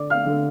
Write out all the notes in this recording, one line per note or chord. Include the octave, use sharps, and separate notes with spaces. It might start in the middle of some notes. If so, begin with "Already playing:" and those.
Already playing: D3 D5 D6
F5 F6
D3